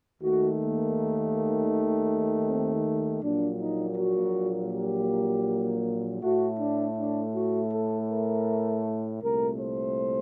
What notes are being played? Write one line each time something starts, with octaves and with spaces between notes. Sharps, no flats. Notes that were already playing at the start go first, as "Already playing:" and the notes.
D#2 D#3 A3 F#4
A#3
C4
A#1 A#2 F#3 A#3 D4
D#4
F#4
G4
A2 A3 F#4
D4
D4
F#4
A4
A#4
C2 A#2 A3 A#4
C5